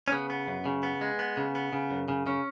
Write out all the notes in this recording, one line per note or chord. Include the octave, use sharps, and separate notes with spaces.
C#4
C#3 B3
B3
F#2
C#3
B3
G#3
B3
C#3
B3
C#3
F#2
C#3
C#3 C#4